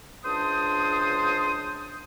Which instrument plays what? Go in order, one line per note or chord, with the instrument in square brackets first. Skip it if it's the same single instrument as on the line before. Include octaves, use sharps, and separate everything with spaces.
[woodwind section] C#2 D4 C5 D#6